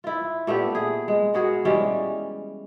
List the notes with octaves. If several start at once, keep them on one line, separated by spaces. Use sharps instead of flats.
E4 F4
A#2 A3 B3 G4
G#4
G#3
B3 F#4 G#4 A#4
E3 G3 G#3 C#4